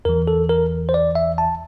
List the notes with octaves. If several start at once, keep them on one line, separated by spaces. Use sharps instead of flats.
E2 E3 A#4
A4
A#4
C5
D5
E5
A5